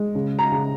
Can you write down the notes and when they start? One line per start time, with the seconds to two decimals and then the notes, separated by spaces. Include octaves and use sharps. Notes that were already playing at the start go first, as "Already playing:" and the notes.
Already playing: G#3
0.15 C#3
0.39 A#5
0.52 C#3